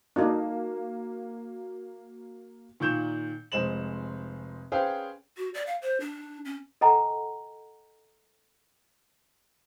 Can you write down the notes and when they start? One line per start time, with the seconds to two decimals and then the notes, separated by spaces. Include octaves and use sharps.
0.16 A#3 D4 D#4 F#4
2.80 A#2 D#3 C#6 G6 E7
3.52 F1 G#3 C5 E7 F#7
4.72 C#4 G#4 B4 C5 F5 G5
5.37 F#4
5.54 D5
5.66 F5
5.82 C5
6.00 D4
6.45 C#4
6.81 A4 D#5 F#5 G#5 A#5